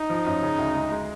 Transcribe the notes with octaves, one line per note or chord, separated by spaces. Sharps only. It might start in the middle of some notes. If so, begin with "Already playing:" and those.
Already playing: D#4
F3
F#2
C#3
D2
G#3
G#3